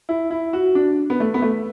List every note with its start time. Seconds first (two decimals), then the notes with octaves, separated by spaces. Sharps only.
0.09 E4
0.30 E4
0.53 F#4
0.75 D4
1.10 B3
1.20 A3
1.34 B3
1.42 A3